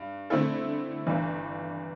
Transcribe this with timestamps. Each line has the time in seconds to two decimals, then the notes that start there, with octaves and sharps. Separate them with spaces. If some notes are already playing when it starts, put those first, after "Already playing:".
Already playing: G2
0.30 D3 A3 C4 E4 A4
1.07 G1 G2 E3